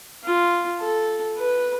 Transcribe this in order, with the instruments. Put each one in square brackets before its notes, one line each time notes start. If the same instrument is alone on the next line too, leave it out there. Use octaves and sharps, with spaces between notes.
[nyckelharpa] F4
A4
B4